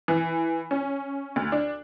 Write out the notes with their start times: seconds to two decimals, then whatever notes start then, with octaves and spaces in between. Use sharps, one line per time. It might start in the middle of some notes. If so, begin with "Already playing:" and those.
0.08 E3
0.71 C#4
1.36 D2
1.52 D4